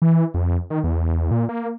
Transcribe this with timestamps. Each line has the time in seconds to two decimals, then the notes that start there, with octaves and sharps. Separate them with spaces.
0.02 E3
0.34 F2
0.70 D#3
0.84 E2
1.31 A#2
1.49 A#3